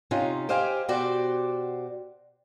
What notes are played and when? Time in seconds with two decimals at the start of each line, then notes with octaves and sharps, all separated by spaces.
0.11 C3 C#4 D#4 F4
0.49 G4 C5 D#5 F5 G5 G#5
0.88 B2 F#4 G4 C5 D5